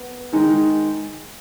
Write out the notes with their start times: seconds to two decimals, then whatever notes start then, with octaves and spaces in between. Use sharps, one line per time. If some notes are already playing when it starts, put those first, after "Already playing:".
Already playing: B3
0.32 D#3 G#3 D#4